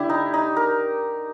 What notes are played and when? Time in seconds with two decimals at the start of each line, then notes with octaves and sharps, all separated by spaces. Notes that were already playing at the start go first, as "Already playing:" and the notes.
Already playing: D3 E4 G4
0.09 D#4
0.34 D#4
0.56 A#4